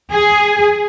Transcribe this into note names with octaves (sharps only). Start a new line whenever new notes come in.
G#4